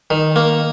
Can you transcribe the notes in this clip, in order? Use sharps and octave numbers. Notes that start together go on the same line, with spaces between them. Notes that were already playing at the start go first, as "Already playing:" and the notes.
D#3
A#3